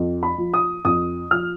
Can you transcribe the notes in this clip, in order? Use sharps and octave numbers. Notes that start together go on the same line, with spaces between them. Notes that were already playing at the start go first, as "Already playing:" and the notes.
Already playing: F2
B5
F3
D#6
F2 D#6
F3 F6